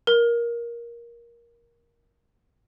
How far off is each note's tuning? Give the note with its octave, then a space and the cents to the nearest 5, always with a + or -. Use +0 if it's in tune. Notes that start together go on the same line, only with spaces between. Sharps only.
A#4 +15